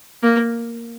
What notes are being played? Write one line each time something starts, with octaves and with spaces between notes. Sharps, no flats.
A#3